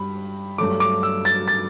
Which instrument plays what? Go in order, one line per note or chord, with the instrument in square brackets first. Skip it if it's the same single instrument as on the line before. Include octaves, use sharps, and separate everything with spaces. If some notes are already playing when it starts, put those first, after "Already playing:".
Already playing: [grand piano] G2 G3 B5
G2 F#3 A3 D6
D6
E6
A6
A6